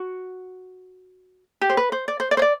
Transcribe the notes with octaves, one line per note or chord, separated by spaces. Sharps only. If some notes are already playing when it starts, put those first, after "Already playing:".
Already playing: F#4
G4
C5
B4
C5
D5
C5
D5
C5
D5